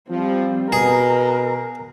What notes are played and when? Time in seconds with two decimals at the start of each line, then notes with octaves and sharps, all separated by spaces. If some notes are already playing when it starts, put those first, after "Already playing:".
0.10 F3 G3 C4
0.72 B2 G#4 A#4